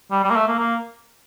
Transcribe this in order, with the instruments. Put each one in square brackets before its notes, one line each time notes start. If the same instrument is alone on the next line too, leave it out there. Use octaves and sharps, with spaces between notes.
[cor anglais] G3
G3
A#3
A3
A#3
A#3